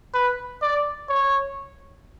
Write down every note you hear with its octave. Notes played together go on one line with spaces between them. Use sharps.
B4
D5
C#5